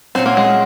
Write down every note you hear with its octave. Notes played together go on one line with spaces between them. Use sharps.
A#2 F#3 C4 C#4 F4
A#3
G#3